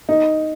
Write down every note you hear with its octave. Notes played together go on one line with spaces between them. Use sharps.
D#4